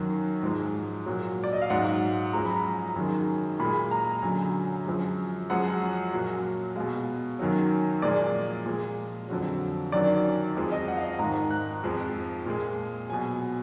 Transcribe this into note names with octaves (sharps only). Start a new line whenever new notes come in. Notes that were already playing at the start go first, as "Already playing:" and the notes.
Already playing: F#2 D#3 F#3
G#2 F3 G#3
A#2 F#3
D5
D#5
F5
G#2 F#3 F#5
F#2 F3 G#3 A#5
B5
A#5
F#2 D#3 G#3
A#2 B5
G#3
A#5
F#2 D3 F#3 G#5
F#2 F3 G#3
F#2 F3 G#3 F#5
A#2 F#3
B2 G#3 F5
F#2 D#3 F#3
A#2 F3 G#3 D5
A#2 F3 G#3
F2 D3 F#3
F#2 D#3 F#3 D5
F2 F3 G#3
D#5
F#5
F5
D#5
G#2 D#3 G#3 A#5
F#6
F2 F3 G#3
A#2 G#3
B2 F#3 G#5